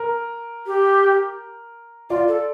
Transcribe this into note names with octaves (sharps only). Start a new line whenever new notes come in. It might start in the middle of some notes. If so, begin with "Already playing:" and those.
Already playing: A#4
G4
F4 D5
A4